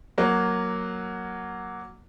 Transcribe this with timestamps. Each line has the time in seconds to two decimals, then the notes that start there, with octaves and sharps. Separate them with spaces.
0.18 F#3 A#3